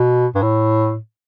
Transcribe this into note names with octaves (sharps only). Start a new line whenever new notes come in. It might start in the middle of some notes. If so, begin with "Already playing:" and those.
Already playing: B2
G2
A2